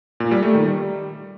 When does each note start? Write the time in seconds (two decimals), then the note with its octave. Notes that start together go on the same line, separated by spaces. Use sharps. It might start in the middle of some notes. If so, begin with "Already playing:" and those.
0.20 A#2
0.31 G3
0.43 A3
0.54 D#3
0.65 G3